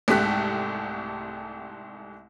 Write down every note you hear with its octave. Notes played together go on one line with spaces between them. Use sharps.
C2 G#2 A3 G4 F#6 B6